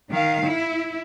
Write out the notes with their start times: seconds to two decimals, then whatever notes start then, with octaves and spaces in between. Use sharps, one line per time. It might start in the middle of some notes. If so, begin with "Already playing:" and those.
0.11 D#3 F5
0.47 E4